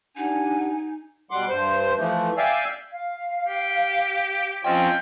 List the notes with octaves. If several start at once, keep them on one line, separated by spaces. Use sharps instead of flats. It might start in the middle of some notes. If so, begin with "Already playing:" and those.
D4 D#4 G4 F#5 G#5
B2 G3 F#5 C6 D6
G2 C5
E3 F3 A3
D5 E5 F5 G5 G#5 E6
F5
G4
F3 C4 C#4 D#5 G5